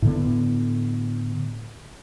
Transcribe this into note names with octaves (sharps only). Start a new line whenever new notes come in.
A2 D3 B3